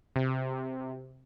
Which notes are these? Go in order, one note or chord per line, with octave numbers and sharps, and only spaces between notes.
C3